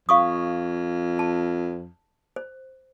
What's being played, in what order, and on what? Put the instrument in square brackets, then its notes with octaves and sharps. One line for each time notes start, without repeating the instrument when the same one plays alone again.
[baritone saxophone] F2 [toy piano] F5 C#6 D#6
[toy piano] A5
C5